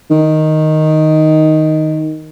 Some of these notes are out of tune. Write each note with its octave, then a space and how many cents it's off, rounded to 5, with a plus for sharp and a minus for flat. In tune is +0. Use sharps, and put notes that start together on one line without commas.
D#3 +0